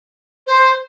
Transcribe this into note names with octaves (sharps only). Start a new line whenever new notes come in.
C5